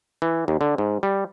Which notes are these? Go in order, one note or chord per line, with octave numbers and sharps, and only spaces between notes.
E3
D#2
D3
G#2
G3